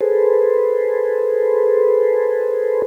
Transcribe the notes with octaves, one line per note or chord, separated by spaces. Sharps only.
G#4 A4 B4 C5